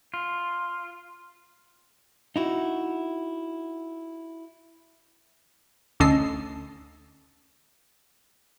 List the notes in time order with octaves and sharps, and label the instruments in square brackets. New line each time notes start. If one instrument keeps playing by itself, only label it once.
[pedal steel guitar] F4
[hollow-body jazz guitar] D#4 E4 F#4
[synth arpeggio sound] D2 D3 C#4 A4 D#5 C7